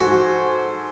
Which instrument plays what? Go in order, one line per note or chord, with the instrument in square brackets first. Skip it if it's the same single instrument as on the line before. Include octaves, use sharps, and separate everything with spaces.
[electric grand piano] G#2 A4 G#5 [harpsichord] F#4 [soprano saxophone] C5